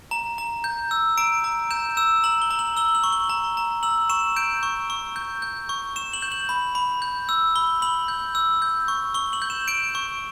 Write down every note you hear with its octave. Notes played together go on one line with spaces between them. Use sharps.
A#5
A#5
G6
E6
A#5 D7
A#5
G6 E7
E6 E7
A#5 F#7
G7
A#5
F#7
E6 G7
F#7
C#6
G7
A#5
A#5
E6 F#7
C#6 E7
G6 D7
C#6
C#6
G6
G6
C#6
C#6 E7
F#7
G6
F#7
B5
B5
G6
E6
B5 G7
B5 F#7
G6
E6
G6
C#6
C#6 G7
F#7
G6
E7
G6 D7
C#6